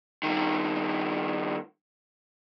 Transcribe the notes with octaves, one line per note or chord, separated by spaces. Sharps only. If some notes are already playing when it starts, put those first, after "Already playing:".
G2 D#3